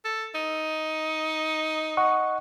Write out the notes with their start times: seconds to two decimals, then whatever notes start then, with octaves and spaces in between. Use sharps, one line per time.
0.05 A4
0.35 D#4
1.97 D#5 F#5 C#6